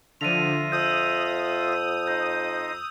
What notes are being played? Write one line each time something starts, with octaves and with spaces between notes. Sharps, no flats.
D3 F3 F4 E5 A#6 D#7 F7
F2 D#6 E6 G6
D#4 C5 D#5 G6